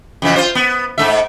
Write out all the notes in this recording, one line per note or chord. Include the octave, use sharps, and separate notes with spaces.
F2 C#3 E3
F4 C5
B3
G#2 A3 E5